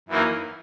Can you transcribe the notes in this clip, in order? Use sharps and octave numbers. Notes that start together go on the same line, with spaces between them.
F#2 E3 A#3 D#4 A#4